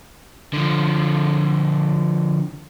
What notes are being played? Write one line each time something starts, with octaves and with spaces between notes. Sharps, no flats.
D3 F3